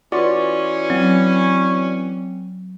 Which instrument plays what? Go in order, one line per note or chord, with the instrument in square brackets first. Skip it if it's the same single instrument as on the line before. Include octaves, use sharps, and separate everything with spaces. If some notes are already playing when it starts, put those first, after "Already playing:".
[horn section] E3 C#4 [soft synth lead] F4 [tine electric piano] F#4 D5 [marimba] B4 C6
[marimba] F#3 [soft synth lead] C4